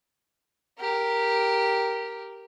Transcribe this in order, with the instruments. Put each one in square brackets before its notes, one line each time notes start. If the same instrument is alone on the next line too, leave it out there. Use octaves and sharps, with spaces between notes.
[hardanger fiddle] G4 A#4